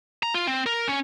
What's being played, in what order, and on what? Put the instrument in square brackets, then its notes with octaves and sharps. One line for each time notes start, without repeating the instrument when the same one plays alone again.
[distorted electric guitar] A#5
F4
C4
A#4
C#4